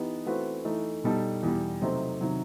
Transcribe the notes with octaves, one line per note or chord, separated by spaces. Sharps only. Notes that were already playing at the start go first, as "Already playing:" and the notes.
Already playing: E3 B3 D#4 G4
E3 A3 C4 F#4 B4
E3 A3 D#4
B2 G3 D#4 A4
E2 B2 G3
C3 F#3 A3 C4 D#4
C3 D#3 F#3